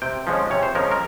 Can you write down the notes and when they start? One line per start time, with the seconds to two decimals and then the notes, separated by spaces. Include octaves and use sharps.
0.02 C3 G5
0.27 F3 G#3 C#4
0.50 C3 C#5
0.63 C5
0.75 F3 G#3 C#4 A#4
0.91 A#4